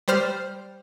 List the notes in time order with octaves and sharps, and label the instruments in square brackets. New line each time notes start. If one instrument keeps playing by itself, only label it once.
[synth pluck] G3 C5 F6